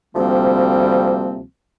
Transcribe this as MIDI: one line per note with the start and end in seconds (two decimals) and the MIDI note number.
0.15 1.42 38
0.15 1.42 48
0.15 1.42 53
0.15 1.42 55
0.15 1.42 58
0.15 1.42 60